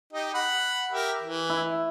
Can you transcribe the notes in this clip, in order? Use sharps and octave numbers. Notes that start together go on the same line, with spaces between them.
D#4 G4 D#5
F#5 B5
G4 A#4 E5
E3
E4